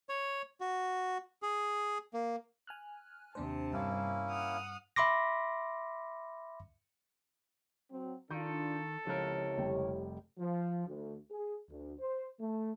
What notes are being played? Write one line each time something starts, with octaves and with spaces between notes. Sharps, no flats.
C#5
F#4
G#4
A#3
G#5 F6 F#6
D#2 C3 D4 C5 A5
G2 A#3 C#4 E4
F#5 D#6 F6
E5 B5 C6 D6 A#6
F#3 C4
D#3 D4 F4 A4 G6
C#2 C3 F3 E4 A#4 C#5
F1 G3 G5
F3
D2
G#4
D2
C5
A3